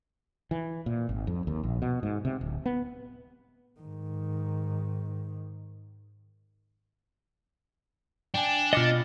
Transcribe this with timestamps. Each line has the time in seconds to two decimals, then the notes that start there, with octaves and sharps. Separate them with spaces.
0.51 E3
0.86 A#2
1.09 G#1
1.27 F2
1.47 D#2
1.63 A#1
1.82 B2
2.03 G#2
2.25 C3
2.41 D1
2.66 B3
3.81 G#2 D#3
8.34 D4 G5 G#5
8.73 B2 F4 D#5 D6 F6 A6 C#7